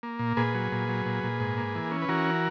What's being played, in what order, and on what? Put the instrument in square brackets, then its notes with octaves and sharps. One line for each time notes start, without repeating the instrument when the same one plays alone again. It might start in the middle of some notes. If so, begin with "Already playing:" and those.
[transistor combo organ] A#3
A#2
A#2 G#4 B4
F#3
A#2
F#3
A#2
A#2
G#2
A#3
E3
C#4
B4
E3 F#4 A#4